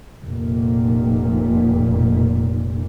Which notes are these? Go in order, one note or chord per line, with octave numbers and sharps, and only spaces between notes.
F1 A#2